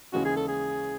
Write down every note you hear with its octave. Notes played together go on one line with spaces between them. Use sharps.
D#2 C#3 E3 G#3 C#4 F#4
G#4
A4
G#4